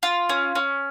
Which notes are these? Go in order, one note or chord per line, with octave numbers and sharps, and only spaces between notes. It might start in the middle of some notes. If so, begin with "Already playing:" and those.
F4
C#4
C#4